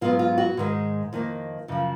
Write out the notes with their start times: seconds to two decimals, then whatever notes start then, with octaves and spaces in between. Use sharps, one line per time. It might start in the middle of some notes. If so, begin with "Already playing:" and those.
0.01 G#2 F#3 B3 F4
0.19 F4
0.38 F#4
0.57 G#2 D#3 G#3
1.13 F2 D#3 A#3
1.68 F#2 C#3 F3